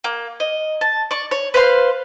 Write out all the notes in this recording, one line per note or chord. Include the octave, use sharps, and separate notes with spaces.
A#3
D#5
A5
D5 C#6
C#5
B4 C5 F5 C6